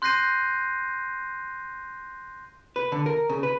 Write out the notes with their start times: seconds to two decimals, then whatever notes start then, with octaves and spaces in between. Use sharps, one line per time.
0.02 C6 F#6 G6 A#6 C7 D#7
2.76 B4
2.92 D3
3.06 A#4
3.29 C#3
3.43 B4